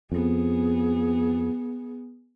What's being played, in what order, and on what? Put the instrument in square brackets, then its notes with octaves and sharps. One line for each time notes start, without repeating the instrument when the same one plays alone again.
[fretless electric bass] F2 [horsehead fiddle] B3 G#4